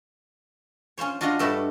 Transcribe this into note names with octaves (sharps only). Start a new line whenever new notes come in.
C#4 F4 C5 C#5
D4 F4 F#4 D#5 F5 F#5
G2 A3 F#4 A5 B5